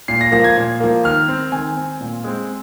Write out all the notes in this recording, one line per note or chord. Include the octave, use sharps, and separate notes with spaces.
A#2 C7
A#6
F3 A#3 A#6
G#6
A#2
F3 A#3
D#3 F6
C4
D#3 G#5
C4
A#2
G#3 C4